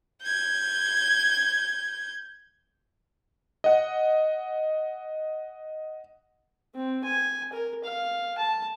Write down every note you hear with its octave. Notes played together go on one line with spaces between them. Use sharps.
G6 G#6
D#5 F#5
C4
G#5
A#4
F5
A5